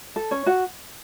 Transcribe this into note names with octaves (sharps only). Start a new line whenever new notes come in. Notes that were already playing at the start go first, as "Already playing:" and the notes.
A4
C#4 C#5
F#4 F#5